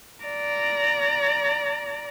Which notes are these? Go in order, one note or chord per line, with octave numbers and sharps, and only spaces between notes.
D5 A#5